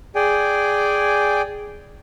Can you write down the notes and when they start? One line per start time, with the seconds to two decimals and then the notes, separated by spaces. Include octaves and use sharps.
0.15 G#4 D5 G5 G#5